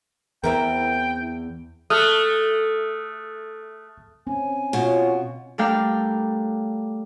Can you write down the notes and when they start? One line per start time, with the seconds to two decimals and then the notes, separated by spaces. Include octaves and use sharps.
0.44 E2 C4 E4 A#4 G5
1.90 A3 D#6 F6 F#6
4.27 C4 C#4 G#5
4.73 B2 F4 C#5
5.58 G3 A3 D4 A#4 F5 G5